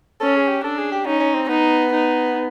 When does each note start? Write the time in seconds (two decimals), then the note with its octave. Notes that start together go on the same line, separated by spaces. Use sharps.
0.21 C#4 A4
0.35 G#4
0.49 G4
0.63 D4 A4
0.77 G#4
0.92 G4
1.06 C#4 D#4
1.20 C#4
1.35 C4
1.48 B3 D#4
1.92 D#4